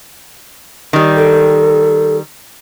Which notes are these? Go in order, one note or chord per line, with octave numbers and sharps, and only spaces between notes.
D#3 G3
A4